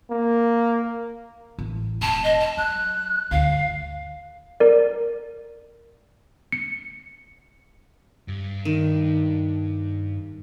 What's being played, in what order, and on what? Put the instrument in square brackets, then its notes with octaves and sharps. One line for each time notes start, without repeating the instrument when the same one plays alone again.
[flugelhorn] A#3
[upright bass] A1
[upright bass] E1 [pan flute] A5
[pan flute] D#5
A5
[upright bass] F#3 [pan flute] F#6
[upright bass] D2 G2 [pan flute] F5
[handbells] A#4 D5
C#7
[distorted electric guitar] G2
[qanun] D#3